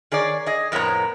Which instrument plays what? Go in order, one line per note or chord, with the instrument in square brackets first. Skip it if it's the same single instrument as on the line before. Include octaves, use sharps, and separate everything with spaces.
[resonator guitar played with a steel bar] D#3 G#4 C#5 D5
G#4 D#5
F2 A2 B3 A#4 C#5 A#5